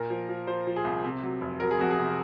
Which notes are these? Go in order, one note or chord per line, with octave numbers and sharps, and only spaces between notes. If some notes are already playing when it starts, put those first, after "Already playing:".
Already playing: A#2 A#4
F3
F3
F3 C5
F3
G#4
C2
C3
F#3
F1
F#3 A#4
G#4
F2 F#4
G#4
C3